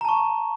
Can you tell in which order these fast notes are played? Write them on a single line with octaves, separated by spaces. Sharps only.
A#5 A5 C#6